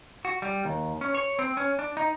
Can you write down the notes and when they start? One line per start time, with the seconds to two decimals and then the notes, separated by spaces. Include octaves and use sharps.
0.25 F#4
0.42 G3
0.65 D#2
1.01 C#4
1.15 C#5
1.39 C4
1.57 C#4
1.79 D4
1.97 D#4